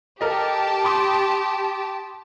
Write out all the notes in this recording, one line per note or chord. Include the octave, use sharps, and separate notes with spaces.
G4 A4 A#4 D#5 A5
B5 C6 D#6